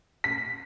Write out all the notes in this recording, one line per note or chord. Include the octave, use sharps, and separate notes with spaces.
B6